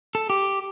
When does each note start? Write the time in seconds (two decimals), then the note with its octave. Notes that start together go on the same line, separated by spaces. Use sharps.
0.15 A4
0.30 G4